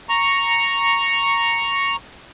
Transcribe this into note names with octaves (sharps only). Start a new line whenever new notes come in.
A#5 C#6